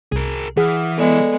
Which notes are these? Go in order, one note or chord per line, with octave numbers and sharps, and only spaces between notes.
C2 G#4 A#4
E3 G#4 F#5 D#6 F6
G#3 B3 A4 D5